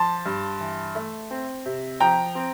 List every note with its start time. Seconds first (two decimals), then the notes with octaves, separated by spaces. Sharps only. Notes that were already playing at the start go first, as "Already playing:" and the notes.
Already playing: F3 A5 C6
0.26 G2
0.60 E3
0.95 A3
1.31 C4
1.66 C3
2.00 F3 G5 A#5
2.35 C4